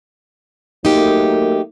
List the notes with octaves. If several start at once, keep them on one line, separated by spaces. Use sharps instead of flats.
F#3 A3 A#3 D#4 G4